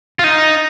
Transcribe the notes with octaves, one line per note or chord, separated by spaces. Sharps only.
F4
D#4